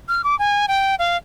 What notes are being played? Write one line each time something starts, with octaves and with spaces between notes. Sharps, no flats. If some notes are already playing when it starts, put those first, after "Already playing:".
F6
D6
G#5
G5
F5